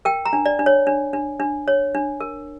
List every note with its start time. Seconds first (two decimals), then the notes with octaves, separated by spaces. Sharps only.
0.05 A#4 G5
0.25 A#5
0.33 D4
0.46 D5
0.59 D4
0.66 C#5
0.87 D4
1.13 D4
1.40 D4
1.68 C#5
1.95 D4
2.20 A#4